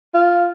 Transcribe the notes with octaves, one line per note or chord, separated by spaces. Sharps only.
F4